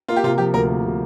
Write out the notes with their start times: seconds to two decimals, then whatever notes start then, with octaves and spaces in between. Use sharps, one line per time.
0.08 A#3 F4
0.16 G4
0.24 C3 F4
0.38 F3 G4
0.54 D2 A#4
0.68 A#3
0.83 C3